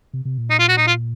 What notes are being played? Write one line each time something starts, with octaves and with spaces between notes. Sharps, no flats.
C3
C3
A#2
D#4
F4
F#4
D#4
F4